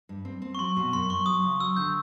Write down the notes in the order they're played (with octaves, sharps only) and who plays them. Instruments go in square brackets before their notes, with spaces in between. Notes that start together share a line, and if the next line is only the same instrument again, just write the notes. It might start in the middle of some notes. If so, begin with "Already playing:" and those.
[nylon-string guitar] G2
C4
C4
[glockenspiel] C#6
[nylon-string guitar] F#3 [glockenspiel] C6
[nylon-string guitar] B2
[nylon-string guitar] F#2 [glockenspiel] C6
[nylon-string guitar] F#2 [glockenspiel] C#6
[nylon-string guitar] F#3 [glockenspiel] D#6
[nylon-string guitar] C#3
[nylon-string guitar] F#3 [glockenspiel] E6
[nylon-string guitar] D3 [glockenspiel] G6